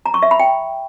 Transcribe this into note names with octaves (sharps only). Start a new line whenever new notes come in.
A#5
C#6
E5
B5
G5